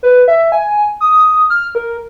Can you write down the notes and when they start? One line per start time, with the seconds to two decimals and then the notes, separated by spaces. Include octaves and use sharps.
0.03 B4
0.28 E5
0.52 G#5
1.01 D#6
1.50 F6
1.75 A#4